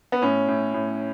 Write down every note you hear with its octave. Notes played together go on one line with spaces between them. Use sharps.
B3
A2 C#4
A2
A2